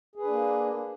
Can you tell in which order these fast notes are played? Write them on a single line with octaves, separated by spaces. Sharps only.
G#4 B4 D4 A#3